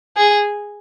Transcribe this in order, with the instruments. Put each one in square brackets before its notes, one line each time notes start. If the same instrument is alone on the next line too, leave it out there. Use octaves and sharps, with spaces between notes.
[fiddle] G#4